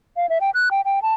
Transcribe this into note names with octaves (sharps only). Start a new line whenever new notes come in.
F5
E5
G5
F#6
G5
G5
A5